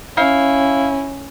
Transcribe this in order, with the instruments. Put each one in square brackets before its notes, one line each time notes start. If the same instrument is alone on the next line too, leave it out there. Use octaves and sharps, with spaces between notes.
[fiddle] C#4 [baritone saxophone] E4 [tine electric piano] F5